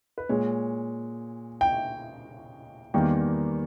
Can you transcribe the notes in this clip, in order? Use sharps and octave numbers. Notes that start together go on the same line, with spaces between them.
B4
A#2 G#3 C#5
G5
E2 D#3 G3 A#3 G5